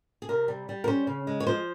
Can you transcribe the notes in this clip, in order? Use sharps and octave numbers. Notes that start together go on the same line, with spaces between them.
G#4
C3 A#4
G3
G3
A#4
C#4 C5
C#3
G#3
C#5
F3 C5